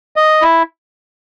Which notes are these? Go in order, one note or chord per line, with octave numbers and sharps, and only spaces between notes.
D#5
E4